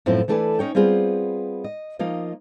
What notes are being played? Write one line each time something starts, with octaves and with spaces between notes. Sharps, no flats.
F#2 A2 F3 C4 E4 F4
E3 A3 D4 A4 B4 G#5
C#4 D#4 C#5 G5
G3 B3 C4 F4 G#4
D#5
F3 A#3 D#4 F4 D#5